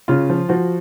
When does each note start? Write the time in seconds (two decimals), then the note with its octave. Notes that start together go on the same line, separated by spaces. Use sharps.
0.08 C#3 F4
0.30 F3
0.49 F3 F#4